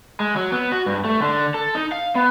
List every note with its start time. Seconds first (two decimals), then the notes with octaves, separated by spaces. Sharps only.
0.20 G#3
0.36 F#3
0.52 B3
0.72 F#4
0.86 G2
1.05 A3
1.22 D3
1.54 A4
1.75 D#4
1.92 F5
2.15 B3